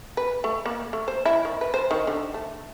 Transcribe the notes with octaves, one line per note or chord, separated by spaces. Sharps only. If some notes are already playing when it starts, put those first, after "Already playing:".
B4
A3
A#3
A3
C5
E4
D#3
B4
C5
D#3
D3
A3